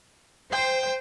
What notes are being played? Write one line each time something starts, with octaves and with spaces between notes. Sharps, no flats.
C5 G5